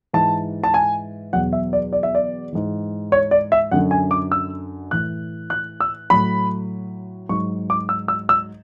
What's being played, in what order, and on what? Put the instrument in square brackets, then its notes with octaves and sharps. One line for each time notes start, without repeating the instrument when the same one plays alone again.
[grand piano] G#2 E3 A5
A5
G#5
E2 B2 F#3 F#5
E5
D5
D5
E5
D5
G#2 E3
C#5
D5
E5
F#2 D3 F#3 F#5
G#5
D6
E6
A2 E3 F#6
F#6
E6
A2 F#3 B5
G#2 F#3 C#6
D6
E6
E6
E6